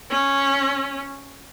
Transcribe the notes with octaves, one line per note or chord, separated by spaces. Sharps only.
C#4